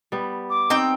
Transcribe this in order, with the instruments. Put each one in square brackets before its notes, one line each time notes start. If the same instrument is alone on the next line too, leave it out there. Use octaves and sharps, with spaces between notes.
[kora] G3 B3
[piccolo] D6
[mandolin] C4 G5 [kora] D#4